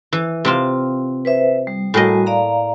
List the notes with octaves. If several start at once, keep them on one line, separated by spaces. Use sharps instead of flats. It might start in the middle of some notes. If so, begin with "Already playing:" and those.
E3
C3 C4 F4
B4 C5 E5
G3
A2 G3 A#3 F#4 D#5 G#5
D5 F5 A#5